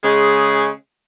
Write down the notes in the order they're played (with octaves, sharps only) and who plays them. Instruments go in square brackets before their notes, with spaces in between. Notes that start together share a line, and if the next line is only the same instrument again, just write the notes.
[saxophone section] C#3 G#3